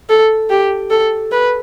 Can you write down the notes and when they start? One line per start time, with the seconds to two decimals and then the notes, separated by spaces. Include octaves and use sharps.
0.09 A4
0.50 G4
0.90 A4
1.31 B4